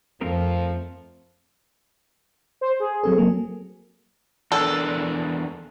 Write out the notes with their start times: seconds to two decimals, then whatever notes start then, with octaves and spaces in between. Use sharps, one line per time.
0.21 F2 F3 A3 C4 A#4
2.61 C5
2.80 G#4
3.04 F#3 C4 A4
3.18 F#3 A#3
4.52 E2 D4 A4 A#4